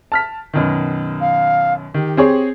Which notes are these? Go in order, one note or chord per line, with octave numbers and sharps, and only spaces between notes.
A5 F6 B6
F#2 B2 D#3
F5
D#3 G4
C4 G#4 C#5